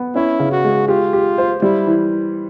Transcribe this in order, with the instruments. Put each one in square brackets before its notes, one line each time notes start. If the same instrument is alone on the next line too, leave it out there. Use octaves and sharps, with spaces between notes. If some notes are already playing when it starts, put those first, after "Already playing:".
Already playing: [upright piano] B3
[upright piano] C#4 [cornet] E4
[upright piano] C#3
[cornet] F#4
[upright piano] G#3
[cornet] F4 [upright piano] G4
[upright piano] G4
C5
[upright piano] G3 [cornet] E4
[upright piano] E3